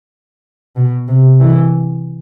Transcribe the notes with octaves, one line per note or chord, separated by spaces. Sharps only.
B2
C3
E3